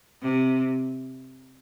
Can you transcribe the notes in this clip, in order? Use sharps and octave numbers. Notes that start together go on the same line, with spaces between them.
C3